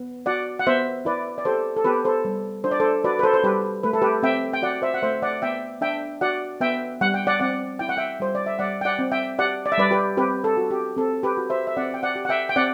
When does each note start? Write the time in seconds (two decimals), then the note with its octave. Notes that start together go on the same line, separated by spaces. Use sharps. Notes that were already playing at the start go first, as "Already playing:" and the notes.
Already playing: B3
0.26 F#4 D5 F#5
0.59 F#5
0.67 B3 C5 E5
1.05 E4 B4 D5
1.38 D5
1.45 G4 A4 C5
1.77 A4
1.85 B3 G4 B4
2.05 A4 C5
2.25 G3
2.64 D4 C5
2.71 D5
2.80 A4 C5
3.04 F#4 B4 D5
3.19 B4
3.23 A4 C5
3.34 C5
3.43 G3 G4 B4
3.83 A3 B4
3.93 A4
4.02 G4 B4
4.23 C4 E5 G5
4.53 G5
4.62 F#4 D5 F#5
4.82 C5 E5
4.94 F#5
5.02 A3 C5 E5
5.22 D5 F#5
5.42 B3 E5 G5
5.81 D4 E5 G5
6.21 F#4 D5 F#5
6.61 B3 E5 G5
7.01 G3 F#5
7.14 G5
7.27 D5 F#5
7.40 C4 D5 F#5
7.79 E4 G5
7.89 F#5
7.97 E5 G5
8.20 G3 C5
8.35 D5
8.46 E5
8.59 G3 D5 F#5
8.81 G5
8.85 D5 F#5
8.99 C4
9.12 E5 G5
9.39 G4 D5 F#5
9.66 D5
9.72 E5
9.78 G3 B4 D5
9.91 G4 B4
10.17 C4 G4 B4
10.44 A4
10.57 F#4
10.71 G4
10.97 C4 A4
11.23 G4 B4
11.37 F#4
11.50 C5 E5
11.67 E5
11.77 C4 D5 F#5
11.94 G5
12.03 D5 F#5
12.16 G4
12.25 F#5
12.29 E5 G5
12.49 G5
12.56 C4 D5 F#5